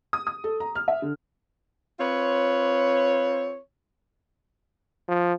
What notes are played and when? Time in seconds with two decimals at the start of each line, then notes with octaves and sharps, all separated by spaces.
0.13 D#6
0.27 D#6
0.44 A4
0.60 A#5
0.75 F6
0.88 E5
1.02 D3
2.00 C4 F4 B4 C#5
5.09 F3